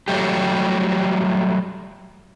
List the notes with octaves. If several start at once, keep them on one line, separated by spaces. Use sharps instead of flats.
F#3 G3 A3 G4